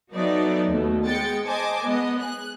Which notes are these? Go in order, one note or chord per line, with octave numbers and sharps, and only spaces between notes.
F#3 B3 D#4 A4 D5 E5
D#2 B2 A3
G#3 B3 G5 A6 C#7
C5 D#5 G#5 A5 D6
G#3 B3 D#5
G#4 F#6